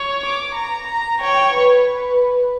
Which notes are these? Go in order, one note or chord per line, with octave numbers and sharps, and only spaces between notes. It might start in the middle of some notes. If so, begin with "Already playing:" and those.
Already playing: C#5
D6
A#5
A#5
C#5 G5
B4